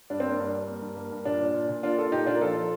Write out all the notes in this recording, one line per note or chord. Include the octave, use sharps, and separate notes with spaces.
G2 D4
A#3 C4
D4
G2
G2
A#3
G2
A#3
G2
A#2 D4
A#2
A#2
A#2
A#3 D4 F4
A#3 F4 A4
A#2 D#4 G4
A#2 D4 F4
A#4
F3 F4 A4
F3